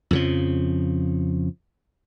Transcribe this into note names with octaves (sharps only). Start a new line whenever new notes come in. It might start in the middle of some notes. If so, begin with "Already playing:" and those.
F2 C#3 F3